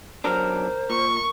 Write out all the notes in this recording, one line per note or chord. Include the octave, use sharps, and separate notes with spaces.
B1 F#3 D4 A#4 C5 F6
A#2 C#6